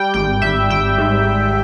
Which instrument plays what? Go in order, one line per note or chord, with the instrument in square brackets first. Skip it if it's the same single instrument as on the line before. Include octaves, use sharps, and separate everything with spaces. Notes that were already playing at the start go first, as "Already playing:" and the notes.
Already playing: [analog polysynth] G3 G5
G#1 G5
G#1 E5
G#1 G5
G#2